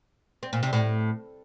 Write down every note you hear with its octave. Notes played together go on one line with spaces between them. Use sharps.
C4
A#2
C3
A2